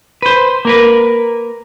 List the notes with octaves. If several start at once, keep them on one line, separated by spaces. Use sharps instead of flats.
B4 C5
A#3 A#4 B4